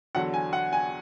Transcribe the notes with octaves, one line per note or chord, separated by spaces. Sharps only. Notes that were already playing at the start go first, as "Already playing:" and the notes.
E2 D3 F#3 F#5
G#5
F#5
G#5